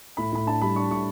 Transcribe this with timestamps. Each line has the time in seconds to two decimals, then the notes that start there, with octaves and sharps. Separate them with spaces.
0.17 A2 B5
0.33 A2 B5
0.46 D4 A5
0.62 G3 B5
0.76 D4 C#6
0.91 A2 C#6